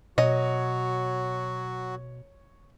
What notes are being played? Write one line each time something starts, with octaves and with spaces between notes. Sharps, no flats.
B2 F#3 F#4 C#5 D#5